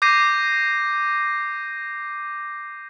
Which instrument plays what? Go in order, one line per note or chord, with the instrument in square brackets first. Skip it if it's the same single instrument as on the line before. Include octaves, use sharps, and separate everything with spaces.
[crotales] D6 G6 A#6 C7 D#7